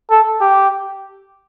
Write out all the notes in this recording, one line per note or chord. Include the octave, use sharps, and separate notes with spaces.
A4
G4